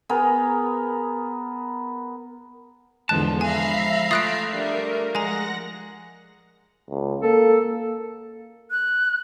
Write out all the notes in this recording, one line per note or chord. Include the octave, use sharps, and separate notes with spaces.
B3 G#4 A#4
E2 G#2 D3 F3 G#3 B3 A5 F#6
E5 F5 G#5 A#5 B5 C7
A3 F4 D#6 F#6 D7
G3 D4 A#4 E5
F3 G#3 F#5 G#5 A#5 A#6
C#2
A#3 A4
F#6